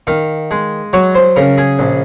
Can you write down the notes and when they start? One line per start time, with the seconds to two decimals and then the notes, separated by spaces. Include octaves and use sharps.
0.07 D#3 F5
0.51 G#3
0.93 F#3 C#5
1.15 C5
1.36 C#3 A#4
1.58 G#4
1.79 A#1